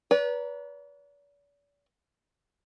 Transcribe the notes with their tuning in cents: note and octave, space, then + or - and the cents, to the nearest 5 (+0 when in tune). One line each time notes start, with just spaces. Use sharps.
B4 -20 D5 -45 A#5 +0